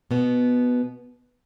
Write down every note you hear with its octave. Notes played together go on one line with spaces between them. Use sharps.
B2 B3